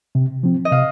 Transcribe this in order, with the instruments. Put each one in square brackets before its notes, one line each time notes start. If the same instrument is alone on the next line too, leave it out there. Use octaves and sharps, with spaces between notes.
[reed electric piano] C3
F3 C4
[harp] D#5
[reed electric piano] C3 [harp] F5